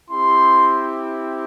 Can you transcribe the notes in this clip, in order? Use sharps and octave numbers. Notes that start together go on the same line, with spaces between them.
C4 E4 G4 C6